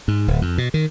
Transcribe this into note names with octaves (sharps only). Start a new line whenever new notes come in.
G#2
D1
F2
B2
D#3